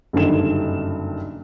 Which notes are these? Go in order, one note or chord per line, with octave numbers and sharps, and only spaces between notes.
F#1 G2 D3 D#3 E7